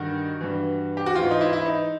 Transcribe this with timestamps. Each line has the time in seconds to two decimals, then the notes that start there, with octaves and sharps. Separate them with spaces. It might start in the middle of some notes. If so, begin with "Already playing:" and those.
Already playing: G2 D#3 F#4
0.41 G2 E3
0.97 G4
1.06 F#4
1.15 G#2 E3 F4
1.31 D#4
1.41 E4
1.53 E4
1.66 D#4